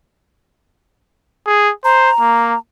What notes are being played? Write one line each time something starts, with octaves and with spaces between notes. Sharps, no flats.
G#4
C5 A#5
A#3